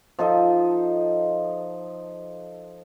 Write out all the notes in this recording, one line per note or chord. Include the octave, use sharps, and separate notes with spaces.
F3 D#4 A4 D#5